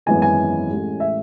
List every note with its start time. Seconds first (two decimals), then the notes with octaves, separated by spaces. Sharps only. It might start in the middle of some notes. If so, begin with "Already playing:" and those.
0.06 G#1 F#2 E3 G#3 B3 G#5
0.22 G#5
0.69 A1 A2 G#3
1.00 E5